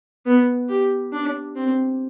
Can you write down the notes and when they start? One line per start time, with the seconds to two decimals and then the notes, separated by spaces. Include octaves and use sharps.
0.26 B3
0.69 G4
1.13 D4
1.56 C4